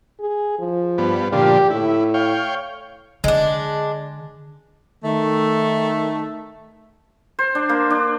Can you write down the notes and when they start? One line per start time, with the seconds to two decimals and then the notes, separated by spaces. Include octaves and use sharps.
0.20 G#4
0.59 F3
0.98 G2 B3
1.33 A#2 D3 F3 G4
1.70 A2 E4
2.14 C#5 F5 G5
3.24 D3 G#3 D4
5.04 D#3 A3
7.39 C5
7.55 D4
7.69 A#3
7.90 D4